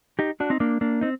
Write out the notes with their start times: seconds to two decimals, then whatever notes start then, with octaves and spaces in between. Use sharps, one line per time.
0.19 D#4 G4
0.40 D4 F#4
0.50 C4 D#4
0.60 A#3 D4
0.81 A#3 D4
1.01 C4 D#4